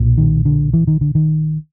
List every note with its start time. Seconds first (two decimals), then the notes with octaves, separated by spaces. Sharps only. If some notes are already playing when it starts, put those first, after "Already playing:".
Already playing: B1 A#2
0.18 D#3
0.45 D3
0.73 E3
0.87 D#3
1.01 D3
1.15 D#3